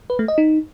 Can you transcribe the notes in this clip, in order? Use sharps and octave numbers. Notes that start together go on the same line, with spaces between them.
B4
A3
D#5
D#4